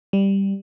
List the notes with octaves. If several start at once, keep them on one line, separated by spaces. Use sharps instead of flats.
G3